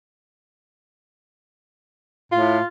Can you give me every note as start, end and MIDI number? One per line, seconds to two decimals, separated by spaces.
2.32 2.59 45
2.32 2.66 65